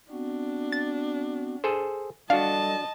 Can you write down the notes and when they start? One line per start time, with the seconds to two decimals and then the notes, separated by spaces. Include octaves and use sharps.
0.11 B3 C4 D4 F#4
0.72 A6
1.64 G#4 A4 C5
2.30 G3 D4 F#4 A4 D#5 F5 A5